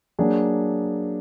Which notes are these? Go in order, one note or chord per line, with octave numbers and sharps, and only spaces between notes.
F#3 A#3 D4 G#4